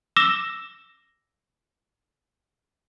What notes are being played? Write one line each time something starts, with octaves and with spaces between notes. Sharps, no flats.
D6 E6 A#6 E7 G7